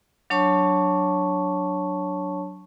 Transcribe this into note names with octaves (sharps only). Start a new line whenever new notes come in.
F#3 D4 C#5 A5 C#6